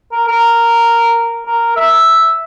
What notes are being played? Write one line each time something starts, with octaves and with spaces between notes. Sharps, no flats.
A#4
A#4
A#4
E5